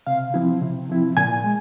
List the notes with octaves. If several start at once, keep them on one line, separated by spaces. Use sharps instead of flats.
C3 F5
F3 C4 E4
C3
F3 C4 E4
A#2 G#5
G#3